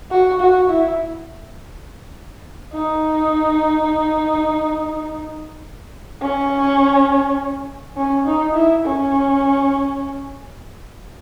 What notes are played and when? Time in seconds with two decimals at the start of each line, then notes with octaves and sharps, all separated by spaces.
0.11 F#4
0.40 F#4
0.69 E4
2.74 D#4
6.22 C#4
7.97 C#4
8.26 D#4
8.55 E4
8.84 C#4